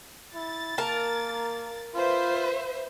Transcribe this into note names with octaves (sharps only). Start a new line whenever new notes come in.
E4 A6
A#3 A#4 A5
F4 B4 C5 E5